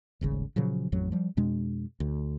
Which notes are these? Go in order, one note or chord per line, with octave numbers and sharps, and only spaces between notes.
D#1 G#1 C#3
A#2 C#3 F3 F#3
A1 F2 A2 F#3
F3 G3
F2 B2 G#3 D4
D2